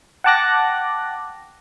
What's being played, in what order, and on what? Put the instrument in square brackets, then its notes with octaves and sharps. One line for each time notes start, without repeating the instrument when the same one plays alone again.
[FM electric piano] F#5 G5 A5 D6 F#6 A#6